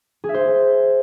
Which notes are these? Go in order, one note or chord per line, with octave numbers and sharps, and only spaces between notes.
G#4
E5
C5